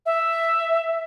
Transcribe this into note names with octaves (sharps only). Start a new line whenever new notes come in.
E5